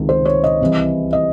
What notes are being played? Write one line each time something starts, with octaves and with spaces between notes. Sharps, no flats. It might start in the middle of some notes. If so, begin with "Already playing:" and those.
Already playing: C#2 C3 D#3
C5
C#5
D#5
C2 C3 E3
D#5